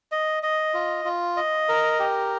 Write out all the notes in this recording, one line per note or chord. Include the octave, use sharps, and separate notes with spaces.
D#5
D#5
F4
F4
D#5
A#4
G4